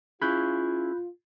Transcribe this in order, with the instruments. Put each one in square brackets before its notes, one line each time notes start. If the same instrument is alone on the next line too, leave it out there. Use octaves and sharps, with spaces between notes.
[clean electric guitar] C#4 E4 G#4 [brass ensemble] F4 [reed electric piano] B5 F#6 G6